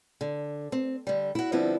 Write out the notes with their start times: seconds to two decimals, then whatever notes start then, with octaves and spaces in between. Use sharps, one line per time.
0.21 D3
0.72 C4
1.07 D3 G3
1.35 E4 F#4
1.52 D3 F3 G3 B3 C4 E4